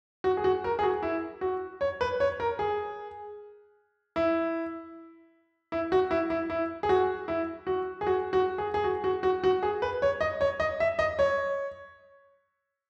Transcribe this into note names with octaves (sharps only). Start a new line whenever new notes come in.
F#4
G#4
F#4
A#4
G#4
F#4
E4
F#4
C#5
B4
C#5
A#4
G#4
E4
E4
F#4
E4
E4
E4
G#4
F#4
E4
F#4
G#4
F#4
F#4
G#4
G#4
F#4
F#4
F#4
F#4
G#4
B4
C#5
D#5
C#5
D#5
E5
D#5
C#5